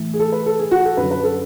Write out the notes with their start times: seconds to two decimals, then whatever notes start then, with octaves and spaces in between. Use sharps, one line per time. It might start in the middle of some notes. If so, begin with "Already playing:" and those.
Already playing: A2 E3
0.14 G#4
0.19 A4
0.32 B4
0.46 A4
0.59 G#4
0.71 F#4
0.85 A4
0.97 F#2 D3 F#3 B4
1.11 B4
1.23 A4